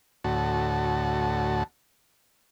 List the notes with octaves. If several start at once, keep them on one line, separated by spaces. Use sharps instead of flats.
D2 A2 F#4 A5